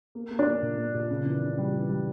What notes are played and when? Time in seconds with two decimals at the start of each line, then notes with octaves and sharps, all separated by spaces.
0.15 A#3
0.31 A#3
0.39 D4
0.46 A#3
0.62 A#2
0.78 A#3
0.94 A#2
1.10 C#3
1.26 E3
1.42 C#3
1.58 G3
1.74 E3
1.89 G3